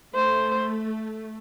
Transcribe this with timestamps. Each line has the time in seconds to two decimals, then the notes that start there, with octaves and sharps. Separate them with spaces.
0.15 A3 C5